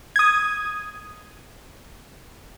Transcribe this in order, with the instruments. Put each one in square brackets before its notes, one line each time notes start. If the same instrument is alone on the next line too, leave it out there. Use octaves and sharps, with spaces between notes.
[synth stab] D#6 G#6